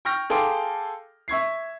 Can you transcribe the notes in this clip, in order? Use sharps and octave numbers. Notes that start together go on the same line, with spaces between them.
G5 C#6 F6 G6 A#6
G#4 A4 F5 G5 C6 D6
E5 C#6 G#6 C7